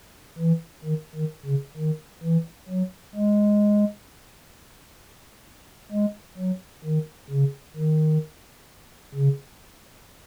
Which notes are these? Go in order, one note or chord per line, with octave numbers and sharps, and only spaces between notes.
E3
D#3
D#3
C#3
D#3
E3
F#3
G#3
G#3
F#3
D#3
C#3
D#3
C#3